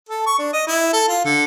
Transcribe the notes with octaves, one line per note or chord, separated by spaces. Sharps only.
A4
C#6
D4
D#5
E4
A4
F4
D3